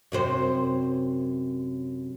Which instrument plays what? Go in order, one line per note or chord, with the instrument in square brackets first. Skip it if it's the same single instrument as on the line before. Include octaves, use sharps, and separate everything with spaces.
[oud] F#2 C3 C5